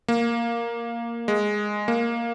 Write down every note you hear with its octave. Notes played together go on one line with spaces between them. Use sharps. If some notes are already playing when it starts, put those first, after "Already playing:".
A#3
G#3
A#3